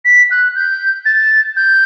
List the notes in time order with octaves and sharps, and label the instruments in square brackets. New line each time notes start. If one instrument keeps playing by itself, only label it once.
[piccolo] B6
F#6
G6
A6
G6